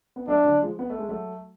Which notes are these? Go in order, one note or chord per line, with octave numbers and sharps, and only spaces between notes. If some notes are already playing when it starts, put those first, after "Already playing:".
B3
F#3 A3 D4
D3 F#3
F3 G#3
B3
A3
G#3
F#3 A3